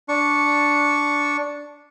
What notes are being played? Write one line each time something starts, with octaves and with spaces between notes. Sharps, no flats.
D4 C#6